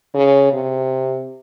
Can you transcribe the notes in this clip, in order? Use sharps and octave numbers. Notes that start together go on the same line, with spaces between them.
C#3
C3